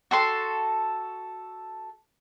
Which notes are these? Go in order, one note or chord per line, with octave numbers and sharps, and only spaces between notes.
F#4 A4 C6